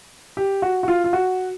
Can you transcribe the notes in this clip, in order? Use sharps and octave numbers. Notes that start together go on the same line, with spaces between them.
G4
F#4
F#4
F4
F4
F#4